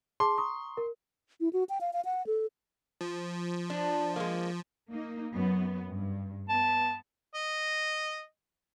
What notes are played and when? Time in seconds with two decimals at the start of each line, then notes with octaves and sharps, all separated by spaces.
0.20 G#4 A5 C6 D6
0.38 A#5 C#6 D#6
0.77 A#4
1.40 E4
1.53 F#4
1.69 G5
1.81 F5
1.93 F5
2.05 F#5
2.27 A4
3.01 F3
3.70 D4
4.16 G#3 A#3
4.91 A#3 D#4
5.34 F#2 B3
5.91 G2
6.49 B3 A5
7.35 D#5